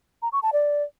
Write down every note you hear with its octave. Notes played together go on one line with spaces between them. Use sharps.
A#5
C#6
A5
D5